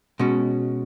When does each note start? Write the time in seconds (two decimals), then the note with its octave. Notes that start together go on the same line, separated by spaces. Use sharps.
0.19 B2 G#3 C#4